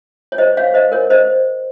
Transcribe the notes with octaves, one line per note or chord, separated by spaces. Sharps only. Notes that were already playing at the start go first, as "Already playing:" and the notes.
C#5
C5 D#5
C#5 F5
C5 D#5
A#4 C#5
C5 D#5